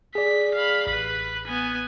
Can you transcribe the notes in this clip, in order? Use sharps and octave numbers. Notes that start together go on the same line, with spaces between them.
G#4 D5 B6
F5 B5
A1 B4 B5
B3 G#5